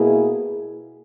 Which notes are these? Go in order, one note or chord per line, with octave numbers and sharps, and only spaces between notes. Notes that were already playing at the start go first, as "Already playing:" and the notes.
Already playing: B2 A#3 E4 G#4